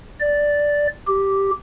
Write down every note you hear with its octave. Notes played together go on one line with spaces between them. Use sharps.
D5
G4